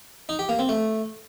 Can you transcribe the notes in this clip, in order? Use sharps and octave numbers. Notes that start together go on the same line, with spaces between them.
D#4
G4
A#3
C4
A3